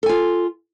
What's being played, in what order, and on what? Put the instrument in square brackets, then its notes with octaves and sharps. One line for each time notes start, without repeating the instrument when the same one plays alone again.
[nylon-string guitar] A4
G#5
F4